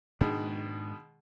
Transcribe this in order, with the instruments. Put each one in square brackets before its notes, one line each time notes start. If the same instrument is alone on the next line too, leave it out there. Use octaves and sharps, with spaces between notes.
[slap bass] G#2 D4 [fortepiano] B2 D#3 G#3